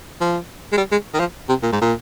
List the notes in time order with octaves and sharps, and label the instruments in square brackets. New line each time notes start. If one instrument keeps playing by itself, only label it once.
[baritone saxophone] F3
G#3
G3
G#3
D#3
F3
C3
A#2
G#2
A#2